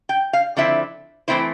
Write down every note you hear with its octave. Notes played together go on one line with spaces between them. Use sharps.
G5
F5
D3 F3 C4 E4 E5
E3 A3 C4 E4 C5